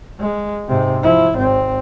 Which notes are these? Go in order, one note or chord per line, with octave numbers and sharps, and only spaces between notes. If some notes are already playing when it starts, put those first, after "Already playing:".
G#3
G#2 C3
F3 E4
G#1 C4